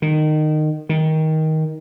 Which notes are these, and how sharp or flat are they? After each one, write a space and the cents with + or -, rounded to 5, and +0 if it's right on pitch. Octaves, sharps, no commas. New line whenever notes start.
D#3 -20
D#3 +15